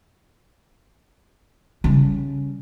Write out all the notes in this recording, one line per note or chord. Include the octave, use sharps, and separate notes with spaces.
C#3 G3